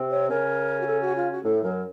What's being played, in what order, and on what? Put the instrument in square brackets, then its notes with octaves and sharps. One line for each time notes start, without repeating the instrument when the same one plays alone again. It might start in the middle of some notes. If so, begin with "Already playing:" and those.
Already playing: [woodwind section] C3 C4
[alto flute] C#5
[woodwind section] C#3 C#4 [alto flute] A#4
[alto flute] F#4
A4
F#4
F4
F#4
[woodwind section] A2 A3 [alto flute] A4
[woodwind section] F#2 F#3 [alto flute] A#4